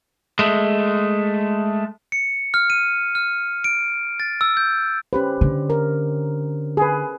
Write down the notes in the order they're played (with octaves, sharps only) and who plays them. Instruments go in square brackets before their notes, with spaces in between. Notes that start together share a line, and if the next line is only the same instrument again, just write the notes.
[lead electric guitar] G#3 A3
[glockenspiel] C#7
F6
D#7
F6
D7
A6
E6
G6
[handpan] C#4 G4 C5 [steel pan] B4
[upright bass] D3
[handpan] A#4
[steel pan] G#4 B4